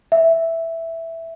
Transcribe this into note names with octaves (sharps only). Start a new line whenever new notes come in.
E5